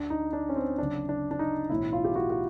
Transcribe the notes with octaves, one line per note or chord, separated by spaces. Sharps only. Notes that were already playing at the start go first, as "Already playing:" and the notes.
Already playing: D2 D3 D4
D#4
D4
C#4
C4
F#1 F#2 D3 D4
D4
D4
D#4
B1 A2 E3 E4
F4
G4
F#4
F#4